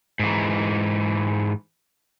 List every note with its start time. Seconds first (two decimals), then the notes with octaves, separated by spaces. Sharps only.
0.19 G#2 E3